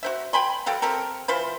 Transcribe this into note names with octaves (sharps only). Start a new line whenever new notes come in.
F#4 C5 E5
G5 G#5 B5 C6
F#3 A4 F5 G5
C4 G4 A4 A#4
E3 F4 B4 C5